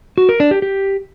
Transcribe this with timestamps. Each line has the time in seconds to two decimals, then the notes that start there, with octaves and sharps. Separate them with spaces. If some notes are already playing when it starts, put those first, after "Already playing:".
0.18 F#4
0.29 A#4
0.40 D4
0.51 G4
0.62 G4